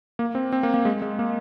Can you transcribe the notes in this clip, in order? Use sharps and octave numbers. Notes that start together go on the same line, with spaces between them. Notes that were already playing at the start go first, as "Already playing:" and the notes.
A#3
C4
C4
A#3
A#3
G#3
G#3
A#3